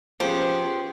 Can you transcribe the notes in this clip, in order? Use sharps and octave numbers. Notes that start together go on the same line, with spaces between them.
F3 B3 C#4 G4 G#4 C5